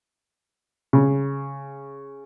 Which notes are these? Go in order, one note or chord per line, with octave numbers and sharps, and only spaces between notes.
C#3